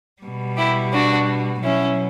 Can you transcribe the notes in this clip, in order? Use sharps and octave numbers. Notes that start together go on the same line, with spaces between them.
B2 G3
E4 G4
D4 F#4
B2 F#3 C#4 E4